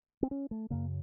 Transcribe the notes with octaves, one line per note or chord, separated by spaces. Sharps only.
C4
C#4
A3
F#2 C#3 A#3